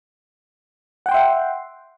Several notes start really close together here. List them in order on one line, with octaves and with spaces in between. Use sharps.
F#5 G5 C6 E5